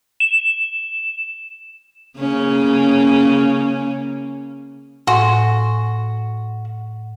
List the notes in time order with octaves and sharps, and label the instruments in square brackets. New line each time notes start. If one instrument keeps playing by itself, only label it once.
[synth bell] E7
[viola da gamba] C#3 A#3 C#4
[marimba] A2 G#5 C6 [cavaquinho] F#4